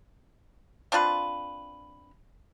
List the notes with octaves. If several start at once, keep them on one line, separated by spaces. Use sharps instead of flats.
C4 D4 F4 B4